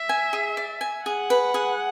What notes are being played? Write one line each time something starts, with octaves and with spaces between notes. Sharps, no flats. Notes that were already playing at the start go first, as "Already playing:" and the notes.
Already playing: E5
G#5
G#4
D5
G#5
G#4 F#5
B4
G#4